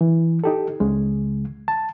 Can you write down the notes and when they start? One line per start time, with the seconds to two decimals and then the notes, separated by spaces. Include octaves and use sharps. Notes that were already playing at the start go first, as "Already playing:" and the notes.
0.01 E3
0.44 D#4 G4 A4
0.80 C#2 C#3 G#3
1.68 A5